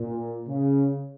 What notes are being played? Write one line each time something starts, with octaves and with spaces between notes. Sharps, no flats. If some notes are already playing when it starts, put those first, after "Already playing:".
Already playing: A#2
C#3